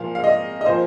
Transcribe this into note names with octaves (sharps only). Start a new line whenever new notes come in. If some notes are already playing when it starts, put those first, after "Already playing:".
Already playing: A#2 F3 F5
F5
D#5
D#5
A#2 F3 C5